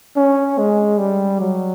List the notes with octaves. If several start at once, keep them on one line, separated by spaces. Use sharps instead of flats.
C#4
G#3
G3
F#3